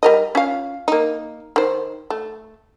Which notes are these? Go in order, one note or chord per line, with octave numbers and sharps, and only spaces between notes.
G3 A#4 D#5
C#4 F4 F5
A#3 D#4
D#3 C5
A3